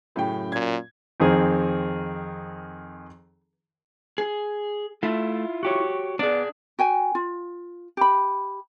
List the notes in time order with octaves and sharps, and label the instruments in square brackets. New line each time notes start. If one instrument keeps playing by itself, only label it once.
[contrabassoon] F#2 [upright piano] A2 C#3 G5
[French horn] A#2 [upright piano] G#6
[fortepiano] F2 D#3 C4 G#4
[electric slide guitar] G#4
[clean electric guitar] A3 [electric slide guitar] E4 F4
[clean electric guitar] F#4 G4 C#5
[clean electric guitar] B3 D5 [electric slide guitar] D4 G#4
[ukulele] F#4 G5 G#5
F4
G4 B5